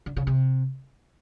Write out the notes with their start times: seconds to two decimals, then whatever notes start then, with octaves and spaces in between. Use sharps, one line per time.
0.06 D3
0.16 C#3
0.27 C3